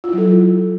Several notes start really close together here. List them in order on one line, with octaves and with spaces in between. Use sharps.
F4 E4 F#3 A4